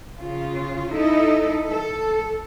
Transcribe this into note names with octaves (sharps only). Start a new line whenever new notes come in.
C#3 F4
D#4 E4 A4 D#5
A4